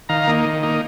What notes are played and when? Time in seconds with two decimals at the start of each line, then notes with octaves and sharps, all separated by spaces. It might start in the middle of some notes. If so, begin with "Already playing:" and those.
0.09 D#3 F5 A#5
0.27 A#3 D#4
0.46 D#3
0.63 A#3 D#4